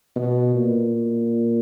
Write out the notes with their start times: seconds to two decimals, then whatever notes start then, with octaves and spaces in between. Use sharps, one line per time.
0.16 B2
0.55 A#2